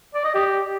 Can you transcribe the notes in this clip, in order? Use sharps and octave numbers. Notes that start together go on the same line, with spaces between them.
D5
D#5
G4